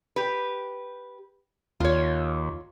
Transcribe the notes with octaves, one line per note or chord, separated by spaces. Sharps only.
G4 B4
D#2 F4 C#5